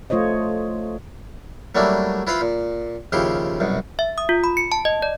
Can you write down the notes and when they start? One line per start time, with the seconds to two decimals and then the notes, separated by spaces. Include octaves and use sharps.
0.10 A3 F4 C5 C#5 D#5
1.75 F#3 G3 A3 A#3 D4 E4
2.27 E4 F4 B4 C5 F5 B5
2.41 A#2
3.12 D#2 C#3 F3 E4 G4 C6
3.60 C2 F#2 B2
3.99 E5
4.18 D#6
4.29 F4
4.44 B5
4.57 C#7
4.72 A5
4.85 D#5
5.02 D5